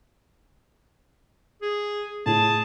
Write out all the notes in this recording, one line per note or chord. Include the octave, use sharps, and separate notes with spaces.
G#4
A2 G#4 A5